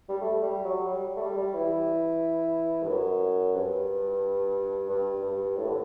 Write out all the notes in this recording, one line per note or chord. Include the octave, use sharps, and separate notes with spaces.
G3
A3
G3
F#3
G3
A3
G3
G3
E3
G2
F#2
G2
G2
G2
A2
D3